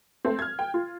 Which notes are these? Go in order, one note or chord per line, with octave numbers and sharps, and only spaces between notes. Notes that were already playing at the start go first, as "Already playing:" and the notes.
A3 C4
F6 G#6
G5
F4